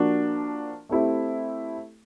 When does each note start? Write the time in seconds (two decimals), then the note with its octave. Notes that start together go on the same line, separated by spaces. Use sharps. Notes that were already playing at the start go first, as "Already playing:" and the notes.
Already playing: F3 A#3 D4 F#4
0.89 A3 C4 E4 G4